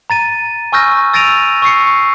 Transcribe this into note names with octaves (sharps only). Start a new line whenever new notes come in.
A#5 A6 D#7
G#5 C#6 E6 F6 G6 A#6
E6 A6 A#6 D7 D#7 F7
C#6 E6 C7 C#7